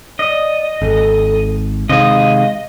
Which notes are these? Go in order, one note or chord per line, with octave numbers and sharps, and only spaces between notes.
D5 D#5
G#1 A4
C3 D#3 G#3 D#5 F5